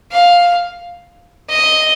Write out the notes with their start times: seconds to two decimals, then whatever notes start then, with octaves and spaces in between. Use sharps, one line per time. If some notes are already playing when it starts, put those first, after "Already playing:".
0.12 F5
1.49 D#5